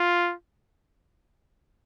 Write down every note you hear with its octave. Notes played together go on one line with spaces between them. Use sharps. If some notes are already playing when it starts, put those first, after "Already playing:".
Already playing: F4